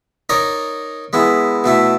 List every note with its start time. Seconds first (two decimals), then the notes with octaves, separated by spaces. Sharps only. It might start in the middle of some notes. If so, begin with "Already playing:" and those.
0.29 D#4 A#4 C#5 D5
1.13 G#3 B3 E4
1.64 B2 A3 E4